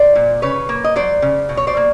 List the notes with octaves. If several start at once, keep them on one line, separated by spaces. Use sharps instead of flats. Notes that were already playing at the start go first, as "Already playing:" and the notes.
Already playing: C5 D5
A#2
C#3 B4 C#5
A#3
D#5
F#3 C5 D5
C#3
B2
C#5
C5 D5
A#3